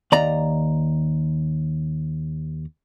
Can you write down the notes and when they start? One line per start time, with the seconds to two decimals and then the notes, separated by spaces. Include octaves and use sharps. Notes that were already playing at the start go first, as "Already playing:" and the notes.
0.12 D#2 D5 A#5